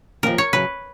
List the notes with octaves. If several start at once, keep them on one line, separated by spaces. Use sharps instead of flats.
D#2 C#3 F3 A#4
C#5
F#2 C#3 F#3 B4